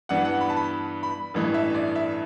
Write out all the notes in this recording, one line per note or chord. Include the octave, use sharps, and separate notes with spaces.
G2 E3 B3 D4 F#5
F#5
B5
A5
B5
B5
A1 G2 E3 A3
E5
D5
E5